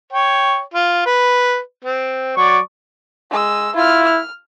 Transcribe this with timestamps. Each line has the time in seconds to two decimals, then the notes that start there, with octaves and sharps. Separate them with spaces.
0.13 C#5 G5
0.74 F4
1.06 B4
1.84 C4
2.37 F#3 D5 C#6
3.31 G#3 E6
3.76 E4 F4 F6
4.05 F6